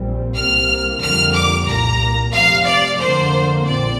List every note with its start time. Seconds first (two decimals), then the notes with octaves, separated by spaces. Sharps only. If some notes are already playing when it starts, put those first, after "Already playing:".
Already playing: A#1 A#2 G3 C4
0.35 C2 C3 A#3 F6
1.01 F2 D3 G3 A#3 F6
1.34 D6
1.68 C2 A#2 A#3 A#5
2.33 F1 F2 C3 G3 F5
2.67 D5
2.99 F2 D3 A#3 C5
3.66 A#1 A#2 F3 C4 D5